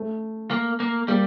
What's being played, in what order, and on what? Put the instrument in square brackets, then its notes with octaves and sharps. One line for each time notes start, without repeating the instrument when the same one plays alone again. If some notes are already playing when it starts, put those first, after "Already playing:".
Already playing: [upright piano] A3
[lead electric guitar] A#3
A#3
[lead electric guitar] G3 [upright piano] A#3